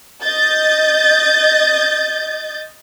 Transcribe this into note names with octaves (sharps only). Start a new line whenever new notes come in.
D#5 G6 A6